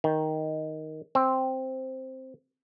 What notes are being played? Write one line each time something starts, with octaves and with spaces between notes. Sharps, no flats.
D#3
C4